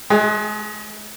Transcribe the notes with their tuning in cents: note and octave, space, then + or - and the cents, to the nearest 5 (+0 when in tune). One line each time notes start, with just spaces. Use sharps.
G#3 +40 G#4 +0